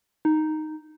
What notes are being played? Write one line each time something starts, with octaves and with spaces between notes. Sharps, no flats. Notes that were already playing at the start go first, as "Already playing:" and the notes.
D#4